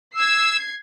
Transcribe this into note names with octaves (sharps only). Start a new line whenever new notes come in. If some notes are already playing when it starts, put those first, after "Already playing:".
E6 G#6 C7